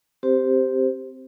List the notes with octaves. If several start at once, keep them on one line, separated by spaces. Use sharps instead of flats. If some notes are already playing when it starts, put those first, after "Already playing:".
C4 G4 C5